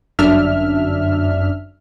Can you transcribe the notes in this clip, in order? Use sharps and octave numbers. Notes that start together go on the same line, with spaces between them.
G1 F#2 D4 E5 F6